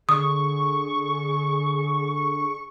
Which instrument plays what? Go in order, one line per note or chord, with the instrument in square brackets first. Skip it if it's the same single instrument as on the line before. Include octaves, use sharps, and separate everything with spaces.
[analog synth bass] D3 [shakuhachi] G#4 [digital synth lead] C#6 [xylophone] D#6